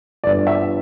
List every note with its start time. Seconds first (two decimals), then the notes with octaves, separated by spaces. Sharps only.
0.24 G1 G2 E3 D5
0.47 E5